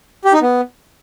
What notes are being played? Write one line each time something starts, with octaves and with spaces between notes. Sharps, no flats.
G4
D#4
B3